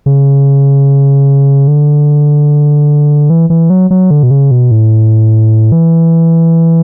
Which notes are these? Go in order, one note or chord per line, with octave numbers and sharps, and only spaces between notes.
C#3
D3
E3
E3
F#3
F#3
D3
B2
C#3
B2
A2
E3